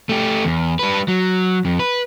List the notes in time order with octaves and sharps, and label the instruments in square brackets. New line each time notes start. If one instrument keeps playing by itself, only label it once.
[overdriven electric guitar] A3 G4
E2
G3 B4
F#3
F2
B4